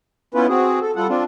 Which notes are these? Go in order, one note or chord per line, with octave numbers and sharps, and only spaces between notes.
B3 C#4 E4 F4 B4
C4 F#4 G#4
A4
G3 F4 A4 F#5
C4 D4 F4